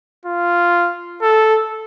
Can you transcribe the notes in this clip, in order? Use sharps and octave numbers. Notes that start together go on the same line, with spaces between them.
F4
A4